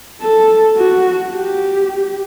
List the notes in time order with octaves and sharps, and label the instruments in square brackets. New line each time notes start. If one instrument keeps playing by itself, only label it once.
[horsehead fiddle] A4
F#4
G4